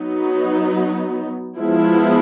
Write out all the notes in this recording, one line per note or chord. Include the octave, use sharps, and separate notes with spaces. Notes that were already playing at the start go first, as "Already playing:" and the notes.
Already playing: F#3 B3 D#4
F3 G#3 B3 E4